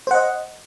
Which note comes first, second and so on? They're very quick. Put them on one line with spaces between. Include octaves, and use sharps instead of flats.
C5 F#5 D#5